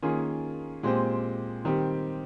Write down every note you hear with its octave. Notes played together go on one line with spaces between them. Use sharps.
D#3 A#3 C#4 F4 G#4
A#2 G#3 C4 G4 C5
D#3 G3 C4 G4